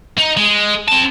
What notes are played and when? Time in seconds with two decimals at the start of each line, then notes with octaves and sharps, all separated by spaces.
0.18 D#4
0.37 G#3
0.88 C4 A5